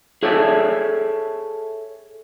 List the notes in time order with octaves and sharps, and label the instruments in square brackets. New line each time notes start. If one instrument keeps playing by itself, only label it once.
[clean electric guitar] G#4 A4 C#5 E5